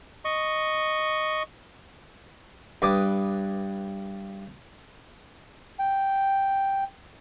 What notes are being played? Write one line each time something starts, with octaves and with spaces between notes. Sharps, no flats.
D#5 C#6
G2 B4 D6 D#6
G5